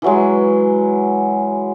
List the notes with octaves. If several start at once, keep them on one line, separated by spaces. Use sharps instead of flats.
E3 F#3 G#3